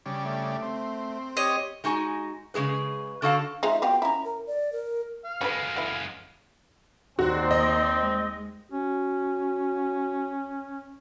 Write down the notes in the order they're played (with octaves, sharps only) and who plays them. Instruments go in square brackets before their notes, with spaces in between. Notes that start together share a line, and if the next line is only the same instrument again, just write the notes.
[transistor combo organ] C#3 G3 D4
[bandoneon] A3
[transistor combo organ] C4
[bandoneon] G4 C#5 [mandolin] D#5
[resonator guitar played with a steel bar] G#3 D#4 F#4 G#5
C#3 G#3 G#4 B4
D3 F#4 A4 F5 A5
[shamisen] F3 G#3 D#4 [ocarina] E5
[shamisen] B3 F4 F#4 [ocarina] G5
[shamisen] C#4 E4 [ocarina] A#5
[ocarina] A#4
D5
A#4
[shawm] F5
[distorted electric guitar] F#2 G#3 [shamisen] D3 G3 B4
[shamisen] D3 B3 E4
[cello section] D#2 C5 D5 [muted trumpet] C4 [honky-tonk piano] F#4
[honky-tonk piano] D#5
[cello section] G#3
[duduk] C#4 [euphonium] F#4